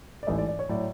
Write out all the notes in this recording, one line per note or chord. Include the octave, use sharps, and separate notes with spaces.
D5
A1 G#2 E3 A3 D#5
D5
D5
C#5
A2 F#3 D5